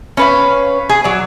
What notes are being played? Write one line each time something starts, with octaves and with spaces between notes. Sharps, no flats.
C#4 B4 F5
G#4
F#3 D5